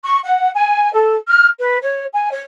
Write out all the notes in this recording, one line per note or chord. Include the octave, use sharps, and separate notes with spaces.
C#6
F#5
G#5
A4
F6
B4
C#5
G#5
C#5